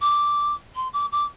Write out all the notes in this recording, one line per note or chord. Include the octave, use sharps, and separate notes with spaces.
D6
C6
D6
D6